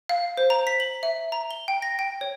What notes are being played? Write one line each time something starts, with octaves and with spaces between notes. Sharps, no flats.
F5
C5
A#5
B6
F#7
E5
A#5
G7
G5
A#6
G5
C#5